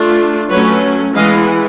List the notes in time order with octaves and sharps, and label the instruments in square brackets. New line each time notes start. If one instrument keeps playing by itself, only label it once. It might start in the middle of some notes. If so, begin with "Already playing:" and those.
Already playing: [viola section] A3 D4 F4
F#3 A3 C#4 B4 C#5
E3 G#3 B3 D#5 F5